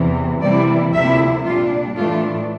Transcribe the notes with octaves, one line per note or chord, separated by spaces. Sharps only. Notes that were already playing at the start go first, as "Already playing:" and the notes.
Already playing: E2 C3 E3
C3 E3 G3 A#3 E4 D5
D2 C3 F3 A#3 E4 E5
A#2 G3 D4 F4
A2 E3 A3 D4 F4